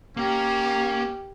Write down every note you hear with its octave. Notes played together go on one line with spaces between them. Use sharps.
A#3 C#4 G4